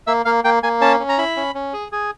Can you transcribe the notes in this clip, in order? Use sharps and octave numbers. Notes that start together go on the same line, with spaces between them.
A#3 E5
A#3 F5
A#3 G5
A#3 G#5
C#4 A5
C#4
A#5
E4 B5
C#4
C#4
G#4
G#4